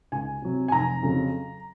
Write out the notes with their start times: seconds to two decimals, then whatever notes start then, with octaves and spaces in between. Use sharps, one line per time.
0.12 C#2 G#5
0.42 C3 F#3
0.68 G#5
0.72 F1 A#5
1.03 F2 C#3 F#3